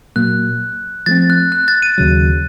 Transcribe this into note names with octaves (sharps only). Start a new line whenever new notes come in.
A#2 F#3 A#3 F#6
F3 A3 C4 A6
F#6
F#6
A6
D#7
D#2 C#3 F#3